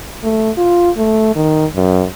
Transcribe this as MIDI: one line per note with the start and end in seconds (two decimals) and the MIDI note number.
0.23 0.50 57
0.57 0.90 65
0.97 1.32 57
1.36 1.65 51
1.75 2.06 42